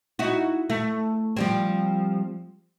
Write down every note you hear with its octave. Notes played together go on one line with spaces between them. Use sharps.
D#4 E4 F#4
A3
F3 G3 C4